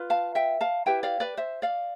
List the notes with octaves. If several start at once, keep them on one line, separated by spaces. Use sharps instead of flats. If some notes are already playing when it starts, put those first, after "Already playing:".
Already playing: F4 B4
F5 A5
E5 G5
F5 A5
E4 G4 B4 E5 G5
D5 F5
B4 D5
C5 E5
D5 F5